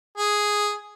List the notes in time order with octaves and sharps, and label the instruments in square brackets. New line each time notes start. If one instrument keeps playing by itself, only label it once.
[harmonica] G#4